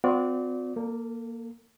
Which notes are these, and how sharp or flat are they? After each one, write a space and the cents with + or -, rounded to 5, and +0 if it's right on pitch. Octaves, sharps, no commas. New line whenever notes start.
C4 -40 F#4 -45 D5 -15
A#3 +0 A4 +35